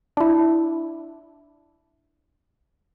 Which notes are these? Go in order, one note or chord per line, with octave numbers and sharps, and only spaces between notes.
D4 E4